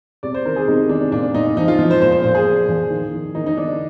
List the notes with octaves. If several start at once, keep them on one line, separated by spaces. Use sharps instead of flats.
C3 D5
C5
D#3 A#4
G#4
C3 D#4
D#3 D4
A#2 D4
A#2 D#4
F3 D#4
F4
F3
C5
A#2 C5
C5
A#2 C5
G#4
A#2
F3
D#3
D#3
D#3 D#4
D#4
D#3 D4